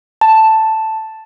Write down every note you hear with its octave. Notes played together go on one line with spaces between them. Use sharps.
A5